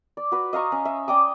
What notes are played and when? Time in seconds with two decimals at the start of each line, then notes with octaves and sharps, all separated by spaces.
0.17 D5
0.32 F#4 B4
0.53 D#5 F5 A#5 C#6
0.72 C#4
0.85 E5
1.08 D5 G5 D6 D#6